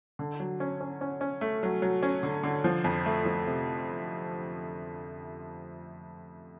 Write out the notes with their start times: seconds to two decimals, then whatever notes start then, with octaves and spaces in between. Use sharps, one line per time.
0.19 D3
0.40 F#3
0.60 C#4
0.81 C#4
1.01 C#4
1.21 C#4
1.41 A3
1.63 F#3
1.82 F#3
2.03 C#4
2.23 D3
2.44 D3
2.64 F3
2.84 F2
3.06 A3
3.25 F3
3.47 C3